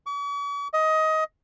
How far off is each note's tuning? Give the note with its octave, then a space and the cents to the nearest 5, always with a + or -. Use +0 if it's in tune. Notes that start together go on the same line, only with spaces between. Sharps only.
C#6 +45
D#5 +20